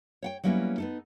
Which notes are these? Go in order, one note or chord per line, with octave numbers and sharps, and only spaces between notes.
C#5 F#5 G5
F#3 G3 A#3 B3 C#4 E4
B3 D#4 A4